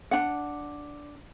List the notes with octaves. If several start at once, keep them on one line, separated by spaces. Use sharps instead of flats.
D4 F#5